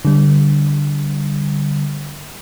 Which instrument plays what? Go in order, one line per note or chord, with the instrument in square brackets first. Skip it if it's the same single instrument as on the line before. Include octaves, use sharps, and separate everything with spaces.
[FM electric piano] D3 G3